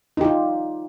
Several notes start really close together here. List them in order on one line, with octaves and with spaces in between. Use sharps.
D#4 G4 F4